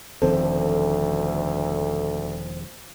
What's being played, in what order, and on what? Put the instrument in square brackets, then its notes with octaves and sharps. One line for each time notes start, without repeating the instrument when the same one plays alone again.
[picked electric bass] E1 D#3 F3 [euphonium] D2 [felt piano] C4 [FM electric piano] A4